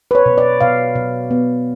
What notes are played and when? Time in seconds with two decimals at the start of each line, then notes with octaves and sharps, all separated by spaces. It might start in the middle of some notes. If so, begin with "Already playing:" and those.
0.11 B4
0.15 C#5
0.26 B2
0.38 D5
0.61 B2 F5
0.95 B2
1.31 B3